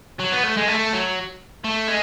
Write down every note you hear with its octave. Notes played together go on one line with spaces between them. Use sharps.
F#3
B3
A3
G#3
A3
F#3
A3
G#3